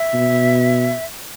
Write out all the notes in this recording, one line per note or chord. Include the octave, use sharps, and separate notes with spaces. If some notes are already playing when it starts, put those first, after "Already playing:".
Already playing: E5
B2